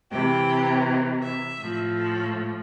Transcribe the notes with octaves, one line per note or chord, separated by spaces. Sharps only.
C3 E3 G4
E5
A2 F3
A4